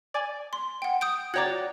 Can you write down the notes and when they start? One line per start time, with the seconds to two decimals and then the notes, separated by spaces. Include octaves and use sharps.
0.14 D5 G#5
0.53 C6
0.82 F#5 G5
1.01 D#6 G6 D7
1.34 F#4 C#5 D5 F#5 G5 A#5 G#6